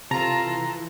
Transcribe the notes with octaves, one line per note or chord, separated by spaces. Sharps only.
C3 E3 F4 A4 A5 A#5